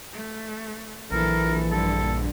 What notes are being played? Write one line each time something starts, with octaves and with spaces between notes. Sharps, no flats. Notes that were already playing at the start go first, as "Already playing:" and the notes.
A3
A#1 E3 F#3 A4 A#4
G2 D3 A4